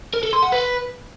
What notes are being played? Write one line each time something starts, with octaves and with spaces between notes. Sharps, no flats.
A#4
A4
C6
F#5
B4